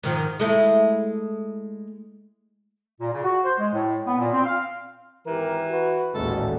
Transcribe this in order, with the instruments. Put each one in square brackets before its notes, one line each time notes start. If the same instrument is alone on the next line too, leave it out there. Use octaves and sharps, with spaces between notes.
[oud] G#2 D#3 F3
G#3 A3 E4
[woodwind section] A#2
C#3
F#4
C5
G#3
A2
B3
A#2
C4
F5
[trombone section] G#1 G4 A#4 [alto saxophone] E3
[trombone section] F#4 B4
[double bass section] A1 D#2 A#2 [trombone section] G#3 A3 F#4 [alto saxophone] A4